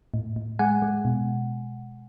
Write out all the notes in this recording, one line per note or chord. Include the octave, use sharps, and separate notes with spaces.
A2
A2
G#3 F#5 G#5
G#3
B2